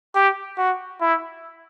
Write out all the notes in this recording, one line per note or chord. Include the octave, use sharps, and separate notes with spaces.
G4
F#4
E4